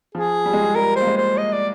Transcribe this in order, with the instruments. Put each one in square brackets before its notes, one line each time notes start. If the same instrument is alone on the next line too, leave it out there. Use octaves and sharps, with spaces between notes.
[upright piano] F3 [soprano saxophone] G#4
[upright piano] G3
G#3
G3
[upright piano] G3 [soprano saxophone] A#4
[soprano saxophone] C5
[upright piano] A#3
G#3
[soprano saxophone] C5
D#5
D5